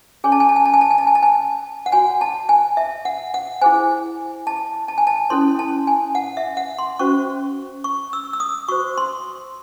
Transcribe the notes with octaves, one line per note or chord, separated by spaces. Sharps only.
C#4 G#4 C#5 G#5
A5
G#5
A5
G#5
A5
G#5
A5
G#5
A5
G#5
A5
G#5
F#5
F#4 C#5 G#5
A5
G#5
E5
F#5
F#5
E4 G#4 C5 G#5
A5
A5
G#5
A5
C#4 E4 A4 C#5 C6
A5
G#5
F#5
E5
F#5
C6
C#4 F#4 C5 C#6
C#6
E6
E6
D#6
F#4 C5 C#6
C6